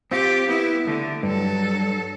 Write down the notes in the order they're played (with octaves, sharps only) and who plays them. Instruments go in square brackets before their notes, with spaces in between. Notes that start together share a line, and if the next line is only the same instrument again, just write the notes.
[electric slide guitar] C4 F4 [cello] G4
[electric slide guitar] B3 [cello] E4
[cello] D3 [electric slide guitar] A3
[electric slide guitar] G2 [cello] F#3 A4